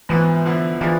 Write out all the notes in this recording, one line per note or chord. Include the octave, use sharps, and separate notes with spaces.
G#2 E3 F3 B3
D3 F3 B3 E4
E3 F3 G#3 D4 F4